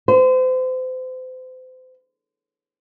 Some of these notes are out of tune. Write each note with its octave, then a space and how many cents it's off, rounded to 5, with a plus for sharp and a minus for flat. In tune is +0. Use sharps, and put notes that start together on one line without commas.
C5 -35